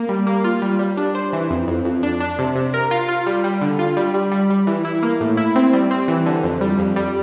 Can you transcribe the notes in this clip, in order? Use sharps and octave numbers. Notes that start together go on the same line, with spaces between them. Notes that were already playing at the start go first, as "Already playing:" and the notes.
Already playing: A#3
G3
A#3
F4
G3
G3
D4
C5
E3
F2
F2
F2
D4
D4
C3
C3
A#4
F4
F4
G3
G3
D3
F4
G3
G3
G3
G3
E3
E4
A#3
A2
E4
C4
G3
C4
E3
D3
F2
G3
F2
G3